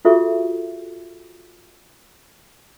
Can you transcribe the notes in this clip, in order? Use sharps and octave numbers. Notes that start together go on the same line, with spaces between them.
F4 F#4 G#4 A4 E5 C#6